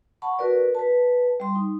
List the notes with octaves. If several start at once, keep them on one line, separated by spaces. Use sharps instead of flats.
F#5 A5 B5 C#6
F#4 A#4 B4 D5
B4 A5
G3 C6
D#4